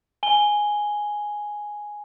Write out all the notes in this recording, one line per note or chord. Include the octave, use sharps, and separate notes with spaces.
G#5 G7